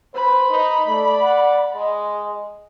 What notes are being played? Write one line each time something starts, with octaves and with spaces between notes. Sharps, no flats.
B4 C5 B5
D#4
A3 D5
F#5
G#3 D#5